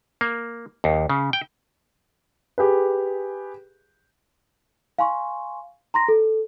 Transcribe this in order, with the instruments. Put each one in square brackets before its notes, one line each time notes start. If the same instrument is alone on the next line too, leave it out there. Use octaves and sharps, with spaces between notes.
[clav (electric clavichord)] A#3
D#2
C#3
G5
[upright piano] G4 G#4 B4
[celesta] F5 G#5 C6 C#6
A#5 C6 A#6
A4